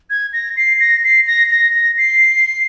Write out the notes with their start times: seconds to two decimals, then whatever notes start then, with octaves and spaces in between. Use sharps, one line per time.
0.10 G#6
0.33 A#6
0.57 C7
0.80 A#6
1.04 C7
1.27 A#6
1.51 A#6
1.75 A#6
1.98 C7